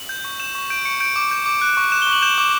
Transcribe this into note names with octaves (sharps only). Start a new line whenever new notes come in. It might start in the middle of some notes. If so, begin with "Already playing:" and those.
Already playing: F#7
G6
C#6
G6 E7
C#6
G6 D7
C#6 C#7
G6 D7
D6
G6
D6
F#6
C#6
F#6 E7
G7
C#6
F#7
G6 E7
D6